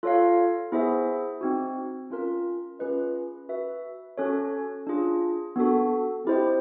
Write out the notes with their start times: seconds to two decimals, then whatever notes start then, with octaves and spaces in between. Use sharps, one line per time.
0.03 F4 A4 C#5 F5
0.72 B3 E4 G#4 C5 E5
1.41 C4 D#4 F#4
2.10 C#4 F4 A#4
2.79 C#4 F4 G#4 B4 D#5
3.49 F#4 B4 E5
4.18 C#4 F#4 A4 C#5
4.87 D4 F4 G#4
5.56 B3 D4 F#4 A4
6.25 C4 E4 G4 C5 D#5